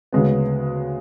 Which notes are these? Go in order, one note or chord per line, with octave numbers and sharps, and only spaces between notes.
D2 C#3 G#3 B3